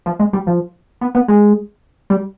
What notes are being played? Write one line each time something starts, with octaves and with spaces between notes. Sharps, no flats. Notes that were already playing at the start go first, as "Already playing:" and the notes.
F3
G#3
G3
F3
B3
B3
G#3
G3